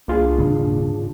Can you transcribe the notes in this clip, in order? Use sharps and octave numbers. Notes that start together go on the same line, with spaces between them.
C2 A#3 D4 F4 G#4
D#1 G#2 C#3 C#4